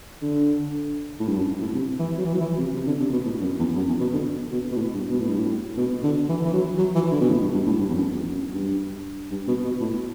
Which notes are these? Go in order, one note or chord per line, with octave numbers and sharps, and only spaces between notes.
D3
A2
G2
F#2
A2
C3
E3
F#3
E3
F#3
E3
C3
C3
D3
C3
B2
A2
F#2
E2
F#2
E2
B2
D3
B2
B2
A2
G2
B2
A2
G2
A2
B2
D3
E3
E3
F#3
F#3
E3
D3
B2
A2
G2
G2
A2
G2
E2
F#2
E2
F#2
G2
G2
B2
B2
A2